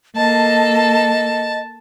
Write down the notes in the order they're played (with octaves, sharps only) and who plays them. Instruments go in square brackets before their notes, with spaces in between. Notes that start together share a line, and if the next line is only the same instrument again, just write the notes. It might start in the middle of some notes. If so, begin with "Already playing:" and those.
[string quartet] A#3 A4 [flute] D#5 [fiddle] A5